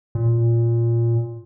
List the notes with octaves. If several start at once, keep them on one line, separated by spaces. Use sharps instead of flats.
A#2